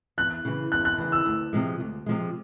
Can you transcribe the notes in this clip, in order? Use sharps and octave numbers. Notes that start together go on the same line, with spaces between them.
E2 F#6
C#3 E3
E2 F#6
F#6
C#3 E3
E6
D2
C3 F3 G#3
D2
C3 F3 G#3